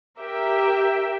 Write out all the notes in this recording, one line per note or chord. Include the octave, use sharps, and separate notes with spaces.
G4 A#4 E5 G5